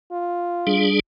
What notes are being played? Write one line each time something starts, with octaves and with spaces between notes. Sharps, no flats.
F4
G3 D4 G#4